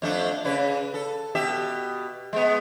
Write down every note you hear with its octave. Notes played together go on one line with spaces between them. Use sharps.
F2 A3 D4
C#3 B4
A4
B2 G4 E5
G#3 B3